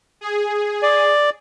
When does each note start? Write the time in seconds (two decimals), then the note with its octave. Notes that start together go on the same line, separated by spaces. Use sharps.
0.21 G#4
0.83 D5